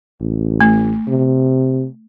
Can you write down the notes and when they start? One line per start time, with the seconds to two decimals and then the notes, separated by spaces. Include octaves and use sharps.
0.21 A1
0.61 A3
1.08 C3